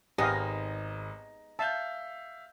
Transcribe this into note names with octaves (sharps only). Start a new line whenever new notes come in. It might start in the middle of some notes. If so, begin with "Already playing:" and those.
G#1 G#3 B3 D#4 G4 D#5 F5 A#6
E5 F5 A5 G6